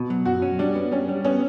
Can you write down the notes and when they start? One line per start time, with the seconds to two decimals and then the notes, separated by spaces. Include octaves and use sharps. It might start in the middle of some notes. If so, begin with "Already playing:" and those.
Already playing: B2
0.10 F#3
0.25 F#2 F#4
0.42 C#4
0.59 G3 D4
0.75 B3
0.91 G3 C#4
1.09 G3
1.24 B3 C#4